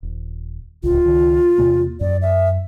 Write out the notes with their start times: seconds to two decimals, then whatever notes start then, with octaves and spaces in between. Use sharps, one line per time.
0.03 D#1
0.83 D1 G#1 C#2 F4
1.06 C#2 D#3
1.58 E2 C3 A#3
2.01 F#2 D5
2.22 E5